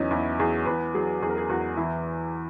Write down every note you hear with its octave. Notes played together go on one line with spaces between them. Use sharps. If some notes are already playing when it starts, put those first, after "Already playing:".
Already playing: E2 F#3 B3 C#4 D#4
E2 E4
E2 G#4
E2 B4
F#3 G#4
E2 G#4
A#4
G#4
E2 F#4
E3 E4